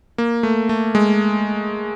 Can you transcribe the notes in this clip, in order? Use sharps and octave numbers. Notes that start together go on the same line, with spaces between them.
A#3
A3
A3
G#3